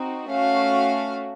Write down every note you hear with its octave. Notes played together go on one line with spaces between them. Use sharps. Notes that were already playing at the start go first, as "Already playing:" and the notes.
Already playing: C4 D#4 F#4
A3 C#4 F#4 F5